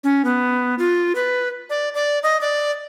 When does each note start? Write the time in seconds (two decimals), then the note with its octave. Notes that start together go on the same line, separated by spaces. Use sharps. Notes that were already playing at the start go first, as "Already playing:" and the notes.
0.04 C#4
0.25 B3
0.79 F4
1.15 B4
1.70 D5
1.95 D5
2.23 D#5
2.41 D5